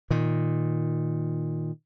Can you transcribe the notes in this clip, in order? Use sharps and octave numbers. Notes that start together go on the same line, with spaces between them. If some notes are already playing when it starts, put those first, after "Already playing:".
A#2 D#3